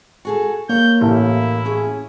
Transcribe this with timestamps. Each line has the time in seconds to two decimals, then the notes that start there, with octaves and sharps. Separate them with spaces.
0.25 F#4 G#4 A4
0.69 A#3 C#5 G6
1.01 A1 E4
1.65 C#4 G#4